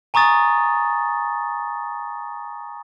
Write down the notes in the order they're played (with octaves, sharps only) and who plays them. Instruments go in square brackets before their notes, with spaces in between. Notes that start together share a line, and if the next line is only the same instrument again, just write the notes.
[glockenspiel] G#5 A#5 C#6 D#6 A6